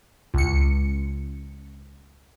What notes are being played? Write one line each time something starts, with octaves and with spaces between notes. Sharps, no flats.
C#2 C#7